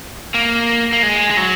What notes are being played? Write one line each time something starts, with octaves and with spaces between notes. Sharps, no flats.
A#3
A#3
G#3
G#3
F#3